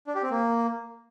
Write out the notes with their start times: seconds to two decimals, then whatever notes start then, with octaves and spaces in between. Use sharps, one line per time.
0.07 D4
0.15 G4
0.23 C4
0.31 A#3